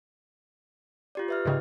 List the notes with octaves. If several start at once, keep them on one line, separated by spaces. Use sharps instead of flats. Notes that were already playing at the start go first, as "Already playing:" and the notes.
F4 G4 D5
B4 E5 F6
G#2 C#3 D5 D#5 G5